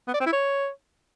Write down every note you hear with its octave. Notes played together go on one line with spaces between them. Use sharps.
B3
D5
C4
E4
C#5